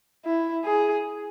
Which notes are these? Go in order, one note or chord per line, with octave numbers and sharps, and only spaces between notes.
E4
G#4